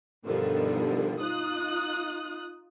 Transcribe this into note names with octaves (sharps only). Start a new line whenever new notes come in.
G2 B2 D3 D#3 F3 G3
D#4 F4 D#6 F#6